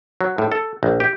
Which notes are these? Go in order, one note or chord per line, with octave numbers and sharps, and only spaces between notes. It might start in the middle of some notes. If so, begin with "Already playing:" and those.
F#3
A2
A4
A#1
G4